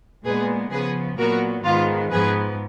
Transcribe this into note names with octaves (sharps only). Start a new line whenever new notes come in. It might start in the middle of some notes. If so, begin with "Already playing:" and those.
A#2 G#3 B3 G#4 B4
C#3 F3 B3 G#4 B4
A#2 F#3 B3 F#4 A#4
G#2 D#3 G#3 B3 F4
G#2 F3 B3 G#4 B4